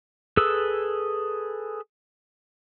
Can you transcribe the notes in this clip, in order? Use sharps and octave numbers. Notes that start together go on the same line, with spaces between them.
G#4 A4 B4 E6